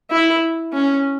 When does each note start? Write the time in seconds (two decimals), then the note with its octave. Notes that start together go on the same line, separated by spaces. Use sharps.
0.11 E4
0.74 C#4